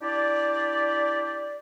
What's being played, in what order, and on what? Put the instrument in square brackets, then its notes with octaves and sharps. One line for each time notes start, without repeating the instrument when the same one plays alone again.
[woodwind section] D4 E4 G4 D5